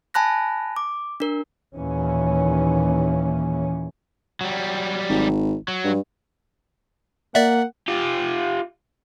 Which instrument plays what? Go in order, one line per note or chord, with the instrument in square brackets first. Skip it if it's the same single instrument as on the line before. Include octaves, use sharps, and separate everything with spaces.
[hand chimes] G#5 A5 B5 F#6 A#6
D6
D4 A#4
[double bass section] D#2 A#2 E3 C#4
[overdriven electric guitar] F#3 G3
[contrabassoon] G#1
[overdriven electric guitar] F#3
[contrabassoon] G2
[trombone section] A#3 [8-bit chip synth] D5 E5 [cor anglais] F#5
[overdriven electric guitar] F4 G4